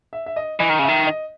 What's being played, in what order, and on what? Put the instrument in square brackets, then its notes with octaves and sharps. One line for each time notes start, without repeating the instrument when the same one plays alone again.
[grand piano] E5
E5
D#5
[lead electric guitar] E3 [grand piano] D#5
[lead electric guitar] D#3
[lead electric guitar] C#3 [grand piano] E5
[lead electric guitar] D#3
[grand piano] D#5